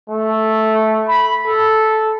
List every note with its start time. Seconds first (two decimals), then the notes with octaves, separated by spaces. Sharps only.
0.10 A3
1.08 B5
1.47 A4